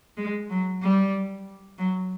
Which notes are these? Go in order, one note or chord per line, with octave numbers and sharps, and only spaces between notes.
G#3
F#3
G3
F#3